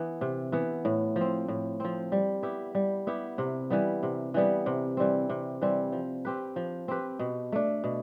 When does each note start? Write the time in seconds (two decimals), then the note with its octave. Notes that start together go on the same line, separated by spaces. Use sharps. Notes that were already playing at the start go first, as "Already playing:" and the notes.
Already playing: E3 B3
0.21 C3
0.52 E3 B3
0.85 A2
1.16 F3 C4
1.48 A2
1.80 F3 C4
2.12 G3
2.43 B3 E4 G4
2.75 G3
3.07 B3 E4 G4
3.38 C3
3.70 E3 G3 B3
4.03 C3
4.34 E3 G3 B3
4.66 C3
4.97 E3 G3 C4
5.30 C3
5.62 E3 G3 C4
5.92 F3
6.25 C4 G4 B4
6.56 F3
6.88 C4 G4 B4
7.19 B2
7.52 A3 D4
7.84 B2